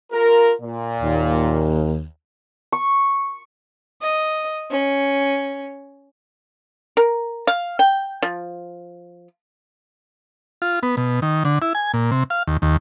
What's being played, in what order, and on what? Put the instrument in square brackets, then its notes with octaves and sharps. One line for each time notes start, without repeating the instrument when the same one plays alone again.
[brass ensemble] F4 A#4
A#2
[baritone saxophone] D#2
[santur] C#6
[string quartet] D#5
C#4
[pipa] A#4
F5
G5
F3
[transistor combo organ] F4
B3
B2
D#3
D3
E4
G#5
A#2
C3
F5
D#2
D#2